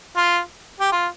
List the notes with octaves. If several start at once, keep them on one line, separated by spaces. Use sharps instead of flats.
F4
G4
F4